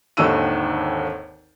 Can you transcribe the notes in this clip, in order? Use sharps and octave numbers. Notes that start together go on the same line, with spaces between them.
G#1 D#2 D3 D#3 E6 D#7